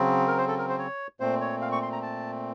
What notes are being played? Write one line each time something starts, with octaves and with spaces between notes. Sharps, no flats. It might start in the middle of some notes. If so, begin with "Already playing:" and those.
Already playing: C#3 F#3 C4
A#4
C5
A4
A#4
C5
C#5
A#2 A3 C4 C5
C#5
F5
C#6
C6
A#5
A5